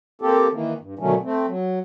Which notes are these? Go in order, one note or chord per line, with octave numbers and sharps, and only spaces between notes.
A#3 C4 G4 A4
D#3 E3 A#3
G2
B2 D3 D#3 F#3 A3 C#4
A3 C4
F#3